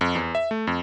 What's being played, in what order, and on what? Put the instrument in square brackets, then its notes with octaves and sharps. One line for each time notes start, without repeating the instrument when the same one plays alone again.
[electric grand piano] F2
E2
E5
A3
F2